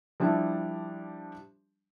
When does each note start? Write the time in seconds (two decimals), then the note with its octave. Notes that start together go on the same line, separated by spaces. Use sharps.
0.20 F3 G3 D4 E4